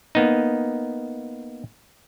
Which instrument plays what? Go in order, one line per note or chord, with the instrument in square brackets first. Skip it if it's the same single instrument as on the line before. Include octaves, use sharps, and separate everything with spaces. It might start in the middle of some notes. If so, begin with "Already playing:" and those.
[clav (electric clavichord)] A#3 B3 D#4